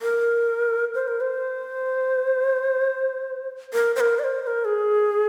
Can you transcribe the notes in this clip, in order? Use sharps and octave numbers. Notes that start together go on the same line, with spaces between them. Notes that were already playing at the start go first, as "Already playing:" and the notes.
A#4
C5
A#4
C5
A#4
C5
A#4
D5
C5
C5
A#4
G#4